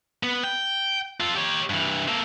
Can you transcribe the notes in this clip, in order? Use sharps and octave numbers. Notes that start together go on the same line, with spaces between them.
B3
G5
F4 A4
G4 C#5
G2 E3
A#3 A4